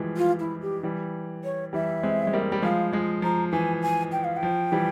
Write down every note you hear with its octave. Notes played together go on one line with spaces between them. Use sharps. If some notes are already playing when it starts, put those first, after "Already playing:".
Already playing: E3 F3 G3 G#3
F4
E4
G4
E3 G3
C#5
E3 G3 E5
G#3 C4
G#3
G3 A#3
G3
F3 G#3 F5
F3 G#3
F3 A#5
E3 G#5
G#5
G5
F5
G5
F3
E3 G3